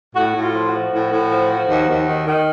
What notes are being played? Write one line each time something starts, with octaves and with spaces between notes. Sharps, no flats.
A2 F#4
A2
F4
F3
F#4
F3
A2
A2
F3
F3
D#2
D#2
D#3
D#3